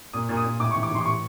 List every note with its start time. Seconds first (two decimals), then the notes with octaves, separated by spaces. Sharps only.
0.13 A#2 D#6
0.29 A#2
0.37 D#6
0.45 A#2
0.60 A2 D6
0.71 C#6
0.76 E3
0.83 D6
0.91 E3 C6
1.01 D6
1.06 A2 C#6